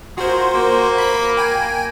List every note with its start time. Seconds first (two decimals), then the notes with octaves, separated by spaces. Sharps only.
0.18 F4 F#4 G#4 A#4 C5
0.55 A#3
0.98 B5 B6
1.37 G5 G#5